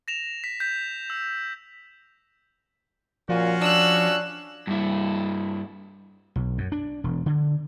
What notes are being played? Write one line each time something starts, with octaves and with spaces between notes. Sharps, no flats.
A#6 E7 F7
B6
G6 B6
E6
A#2 F3 C#4 F4 F#4
D4 E6 F#6
G2 E4
B1
F#2
D4
E1
D3